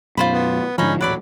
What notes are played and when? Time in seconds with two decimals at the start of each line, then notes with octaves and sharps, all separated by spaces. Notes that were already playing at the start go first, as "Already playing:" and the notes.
0.17 F#2 B2 F4 C5 B5
0.33 B3
0.78 G#2 D3 F3 C#4 D#4 B5
1.01 D#1 A1 F#3 B4 D5 B5